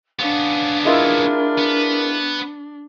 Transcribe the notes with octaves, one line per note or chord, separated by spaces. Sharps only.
B3 C#4 D4 F5
G#3 E4 F4 A#4
B3